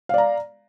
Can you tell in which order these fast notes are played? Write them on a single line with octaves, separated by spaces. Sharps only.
F5 D5 A#5